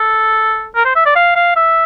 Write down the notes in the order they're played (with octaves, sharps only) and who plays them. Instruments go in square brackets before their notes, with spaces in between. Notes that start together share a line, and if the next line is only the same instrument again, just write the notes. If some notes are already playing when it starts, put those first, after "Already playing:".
Already playing: [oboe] A4
A#4
C5
E5
D5
F5
F5
E5